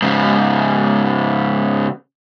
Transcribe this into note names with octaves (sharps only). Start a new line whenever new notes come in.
G#2 C#3